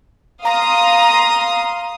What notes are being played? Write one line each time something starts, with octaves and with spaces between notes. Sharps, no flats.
F5 A#5 C6 D#6